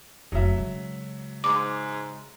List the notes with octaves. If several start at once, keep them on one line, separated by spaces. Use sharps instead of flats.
F1 F#3 E5
C#3 G#3
G#2 D6